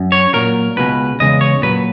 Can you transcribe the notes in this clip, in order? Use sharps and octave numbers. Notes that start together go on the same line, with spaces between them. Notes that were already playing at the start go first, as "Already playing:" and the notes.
Already playing: F#2
C#5
A#2 F#3 A#4
C#2 B2 G#3 B4
E2 C#3 G#3 D#5
C#5
A#2 F#3 B4